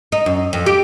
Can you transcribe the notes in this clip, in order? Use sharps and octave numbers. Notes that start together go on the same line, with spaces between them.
D#4
F#2
F2
G4